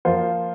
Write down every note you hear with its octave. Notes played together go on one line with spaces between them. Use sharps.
F3 A#3 F4 C5